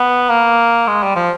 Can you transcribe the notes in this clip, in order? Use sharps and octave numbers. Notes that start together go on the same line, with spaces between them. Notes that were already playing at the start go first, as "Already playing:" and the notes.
Already playing: B3
A#3
G#3
G3
F3